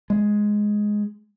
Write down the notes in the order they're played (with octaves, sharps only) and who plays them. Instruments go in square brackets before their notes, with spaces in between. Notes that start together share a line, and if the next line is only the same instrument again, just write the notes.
[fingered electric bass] G#3